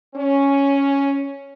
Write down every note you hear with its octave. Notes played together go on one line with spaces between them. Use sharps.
C#4